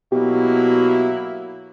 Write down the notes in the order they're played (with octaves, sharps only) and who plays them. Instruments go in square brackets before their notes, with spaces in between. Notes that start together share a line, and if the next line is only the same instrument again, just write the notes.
[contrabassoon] B2 [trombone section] F#3 A#3 E4 [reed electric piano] G4